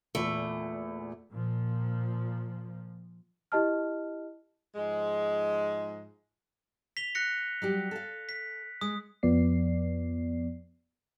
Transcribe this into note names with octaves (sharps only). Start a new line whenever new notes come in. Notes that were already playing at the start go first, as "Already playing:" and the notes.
E2 A#2 A3
A#2 F3
E4 G4 D#5 A5 F6
G#2 F3 G#3
B6 F7 G7
F#6 A#6 C#7
F#3 G3 G4
A4 F5
B6
G#3 D#6
F2 F3 B3 D5 C7